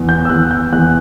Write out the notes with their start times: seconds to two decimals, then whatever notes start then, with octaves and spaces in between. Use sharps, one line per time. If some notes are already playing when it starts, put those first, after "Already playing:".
Already playing: E2
0.09 G6
0.25 E6
0.29 E2 F#6
0.51 G6
0.73 E2 F#6